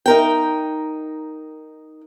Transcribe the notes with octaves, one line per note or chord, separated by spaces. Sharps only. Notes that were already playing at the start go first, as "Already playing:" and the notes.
D#4 A#4 G5